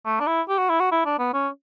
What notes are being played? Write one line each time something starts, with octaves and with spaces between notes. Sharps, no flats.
A3
D4
E4
G4
F#4
E4
F#4
E4
D4
B3
C#4